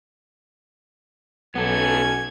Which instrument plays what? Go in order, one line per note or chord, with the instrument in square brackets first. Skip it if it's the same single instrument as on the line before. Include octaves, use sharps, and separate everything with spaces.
[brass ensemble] B1 C#4 [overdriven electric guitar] B3 A4 [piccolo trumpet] G#6